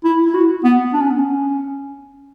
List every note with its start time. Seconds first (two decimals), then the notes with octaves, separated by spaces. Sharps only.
0.04 E4
0.26 E4
0.34 F#4
0.64 B3
0.93 D4
1.02 C#4
1.10 B3
1.18 C#4